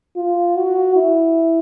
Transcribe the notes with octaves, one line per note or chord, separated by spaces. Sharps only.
F4
F#4
E4